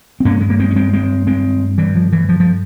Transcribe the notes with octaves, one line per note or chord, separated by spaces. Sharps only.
C4
G2 A#3 C#4
G#3
A#3
G#3 C4
C#4
G#3 C4
G#3 C4
G#3 C4
E3 G3
F3
E3
F3
F3